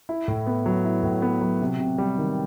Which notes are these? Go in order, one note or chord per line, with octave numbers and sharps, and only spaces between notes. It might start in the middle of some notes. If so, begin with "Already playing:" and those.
E4
A2
B3
F#3
E4
A2
B3
F#3
C3
C3
G3
D#3